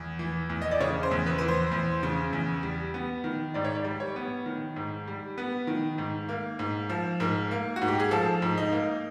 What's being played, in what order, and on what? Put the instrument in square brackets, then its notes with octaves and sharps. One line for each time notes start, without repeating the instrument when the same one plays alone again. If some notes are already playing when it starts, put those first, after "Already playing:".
Already playing: [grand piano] E2
E3
E2
D#5
D5
C#3 C#5
C5
E2
B4
E3 B4
C5
E2
C#3
E2
G3
B3
D#3
G#2 D5
C#5
D5
G3
C#5
B3
D#3
G#2
G3
B3 B4
D#3
G#2
A#3
G#2
F3
G#2 A#4
A#3
F#4
G#2
G4
G#4
F3 A4
G#2
D#4
A#3